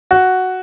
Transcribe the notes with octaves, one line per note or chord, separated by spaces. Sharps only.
F#4